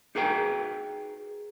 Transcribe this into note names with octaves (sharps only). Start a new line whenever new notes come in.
D#4 F#4 G#4 A#4 B4 G5